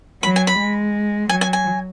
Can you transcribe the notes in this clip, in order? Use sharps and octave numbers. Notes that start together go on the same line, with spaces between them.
F#3 B5
G#5
B5
G#3
F#3 G#5
G#5
G#5